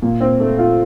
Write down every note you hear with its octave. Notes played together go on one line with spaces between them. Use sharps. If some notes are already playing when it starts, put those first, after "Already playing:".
A#2
C4
A3
F4